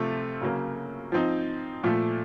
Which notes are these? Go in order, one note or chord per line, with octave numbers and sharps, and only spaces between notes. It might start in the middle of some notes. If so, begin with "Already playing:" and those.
Already playing: C3 F3 A3 C4 F4
C#3 F#3 A#3
F3 C4 D#4
A#2 F3 A3